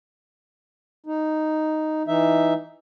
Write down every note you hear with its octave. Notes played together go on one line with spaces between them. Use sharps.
D#4
E3 D#4 E5